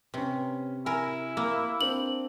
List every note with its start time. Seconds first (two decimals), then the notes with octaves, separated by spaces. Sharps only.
0.14 C3 C#4 B4
0.86 E4 A#4 G#5
1.37 A#3
1.81 C4 D4 F#7